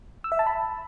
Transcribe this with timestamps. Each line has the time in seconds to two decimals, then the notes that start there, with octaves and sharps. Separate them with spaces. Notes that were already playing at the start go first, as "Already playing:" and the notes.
0.24 E6
0.32 E5
0.39 A5
0.47 B5